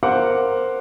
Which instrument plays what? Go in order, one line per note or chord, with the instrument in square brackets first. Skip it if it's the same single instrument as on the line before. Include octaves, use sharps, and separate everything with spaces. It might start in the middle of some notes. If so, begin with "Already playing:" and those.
[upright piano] A#4 C5 F5 F#5 D6